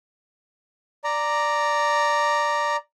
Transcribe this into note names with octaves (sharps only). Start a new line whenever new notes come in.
D5 A#5